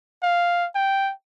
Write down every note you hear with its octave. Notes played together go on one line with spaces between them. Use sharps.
F5
G5